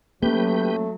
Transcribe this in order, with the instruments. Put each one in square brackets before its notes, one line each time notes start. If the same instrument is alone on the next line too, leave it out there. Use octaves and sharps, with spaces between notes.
[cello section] F#3 [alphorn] A3 [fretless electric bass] A#3 C#4 [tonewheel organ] G4 B4 G6